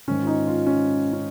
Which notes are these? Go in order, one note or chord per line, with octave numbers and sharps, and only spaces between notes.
G#2 D#3 C#4
F4
D#4
F4
C#4
C#4